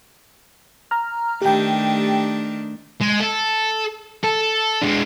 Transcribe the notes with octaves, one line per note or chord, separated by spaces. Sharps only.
A#5 F6
D#3 A3 D4 G4 G5
G#3
A4
A4
G#3 D4